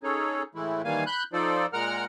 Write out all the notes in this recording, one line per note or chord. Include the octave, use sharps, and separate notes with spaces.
C#4 D#4 G#4 A4 C#5
A2 E3 G#3 A3 E4
D#3 E3 G3 A#3 F5 G#5
B5 F#6 G6
F3 D#4 F4 A4 C5 D5
A#2 G#3 A#4 F#5 A#5 F6